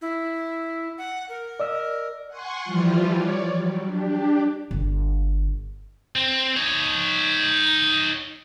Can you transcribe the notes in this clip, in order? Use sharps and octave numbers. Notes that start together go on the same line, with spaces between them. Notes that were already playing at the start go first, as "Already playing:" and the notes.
E4
F#5
A#4
D5 D#5 E6
F#5 G#5 C6 C#6
E3 F3 G3 F4
C#5 D5
F#3 G3
D4 G4
G1
C4
D#4 C#5